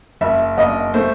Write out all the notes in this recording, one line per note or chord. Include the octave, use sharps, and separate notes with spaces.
F#1 E5
F#1 D#5
A3 C5